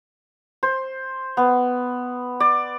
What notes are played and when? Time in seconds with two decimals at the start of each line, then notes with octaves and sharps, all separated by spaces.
0.63 C5
1.37 B3
2.40 D5